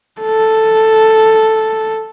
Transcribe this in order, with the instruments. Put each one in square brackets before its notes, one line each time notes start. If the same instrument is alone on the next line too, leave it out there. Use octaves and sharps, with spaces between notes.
[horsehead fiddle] A4